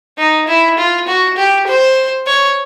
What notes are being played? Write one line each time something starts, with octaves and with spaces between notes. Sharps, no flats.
D#4
E4
F4
F#4
G4
C5
C#5